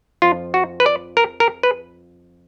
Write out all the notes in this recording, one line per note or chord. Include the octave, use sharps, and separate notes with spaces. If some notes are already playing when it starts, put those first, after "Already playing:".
F2 F3 F4
F#4
B4
D5
A#4
A#4
B4